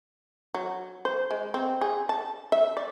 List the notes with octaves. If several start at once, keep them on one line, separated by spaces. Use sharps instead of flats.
F#3
C5
G#3
C4
G#4
A5
E5
D5